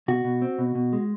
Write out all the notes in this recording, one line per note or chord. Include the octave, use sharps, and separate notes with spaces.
B2 F#4
B2
C4
B2
B2
G#3